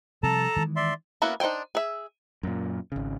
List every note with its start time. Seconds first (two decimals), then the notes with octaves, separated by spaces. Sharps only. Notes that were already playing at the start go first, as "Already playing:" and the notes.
0.23 C3 F3 G3 A4 A5 A#5
0.56 D#3 E3 G#3
0.76 D5 E5 C6
1.22 A#3 B3 C#4 E4 F#4
1.40 D4 D#4 C5 G5 G#5
1.75 G#4 E5
2.43 F#2 A#2
2.92 G#1 C#3